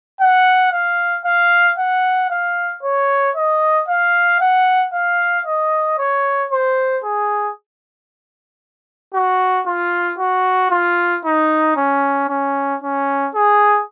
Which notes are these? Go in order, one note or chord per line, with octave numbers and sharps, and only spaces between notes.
F#5
F5
F5
F#5
F5
C#5
D#5
F5
F#5
F5
D#5
C#5
C5
G#4
F#4
F4
F#4
F4
D#4
C#4
C#4
C#4
G#4